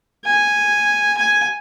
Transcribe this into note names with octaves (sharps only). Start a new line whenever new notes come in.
G#5
G#5